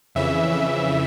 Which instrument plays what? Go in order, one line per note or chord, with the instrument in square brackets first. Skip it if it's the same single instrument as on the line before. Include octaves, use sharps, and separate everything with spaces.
[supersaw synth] F2 C#3 E3 E5
E5